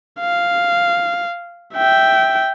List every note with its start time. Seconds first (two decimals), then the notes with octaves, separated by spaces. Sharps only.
0.20 F5
1.74 E5 G5